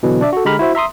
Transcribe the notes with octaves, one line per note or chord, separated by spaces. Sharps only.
B2 D3 E3 F#3
D4 D5 E5
F#4 A4
D3 G#3 G4 A#5 B5 F6
E4 F#4 C5 E5
E5 A#5 C6 D#6